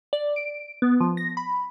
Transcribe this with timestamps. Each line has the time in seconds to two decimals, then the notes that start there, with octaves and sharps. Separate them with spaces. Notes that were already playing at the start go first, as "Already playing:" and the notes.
0.13 D5
0.36 D7
0.82 B3
1.01 F3
1.17 A#6
1.37 B5